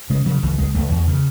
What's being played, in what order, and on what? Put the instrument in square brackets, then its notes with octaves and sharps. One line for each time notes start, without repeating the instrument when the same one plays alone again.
[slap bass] C#3 G#3
C#3 F#3
C#2 E3
C#2 G#3
C#2 A3
E2
C#3